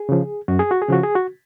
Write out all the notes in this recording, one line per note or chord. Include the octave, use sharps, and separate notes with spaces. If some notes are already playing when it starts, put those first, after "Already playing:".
Already playing: G#4
C#3 F3
F#2 F#4
G#4
F#4
G#4
C#3 F3 F#4
G#4
F#4